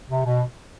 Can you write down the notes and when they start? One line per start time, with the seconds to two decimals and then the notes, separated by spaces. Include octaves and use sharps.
0.09 C3
0.25 B2